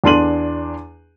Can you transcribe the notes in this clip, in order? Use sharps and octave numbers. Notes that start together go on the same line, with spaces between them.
E2 D4 C6 D#7 F#7